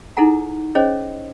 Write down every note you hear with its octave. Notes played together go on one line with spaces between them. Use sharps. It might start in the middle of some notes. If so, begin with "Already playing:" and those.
D#4 E4 G#4 A4 F#5 A#5
C#4 G#4 C5 C#5 D#5